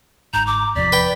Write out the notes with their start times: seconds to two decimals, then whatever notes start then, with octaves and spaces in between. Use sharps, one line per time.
0.34 G1 G#2 A#5 G6
0.47 A#5 D6
0.75 E2 C3 F3 D5 B6
0.92 B4 G5